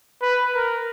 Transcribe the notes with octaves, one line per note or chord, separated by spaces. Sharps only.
B4
A#4